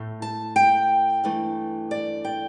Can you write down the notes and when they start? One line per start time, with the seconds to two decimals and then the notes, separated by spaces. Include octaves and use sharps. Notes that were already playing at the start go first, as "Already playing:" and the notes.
Already playing: A2 A3
0.22 A5
0.56 G5
1.24 G2 E3 A3
1.91 D5
2.25 G5